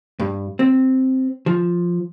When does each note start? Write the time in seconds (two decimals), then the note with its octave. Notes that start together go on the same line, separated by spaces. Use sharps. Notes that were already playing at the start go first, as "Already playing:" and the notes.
0.19 G2
0.59 C4
1.46 F3